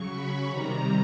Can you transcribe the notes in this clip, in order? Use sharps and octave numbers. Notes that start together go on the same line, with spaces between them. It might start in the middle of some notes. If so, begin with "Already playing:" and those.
Already playing: C#3 F#3 C#6
B5
C3 D#3 G3 A#5